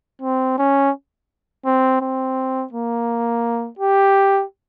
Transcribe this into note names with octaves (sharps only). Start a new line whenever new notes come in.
C4
C#4
C4
C4
A#3
G4